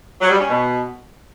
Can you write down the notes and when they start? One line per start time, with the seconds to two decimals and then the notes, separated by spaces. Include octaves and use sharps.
0.21 F#3
0.30 G3
0.39 C#4
0.49 B2